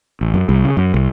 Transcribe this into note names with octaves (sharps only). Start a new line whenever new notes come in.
A1
F#2
C2
C#3
F#2
C2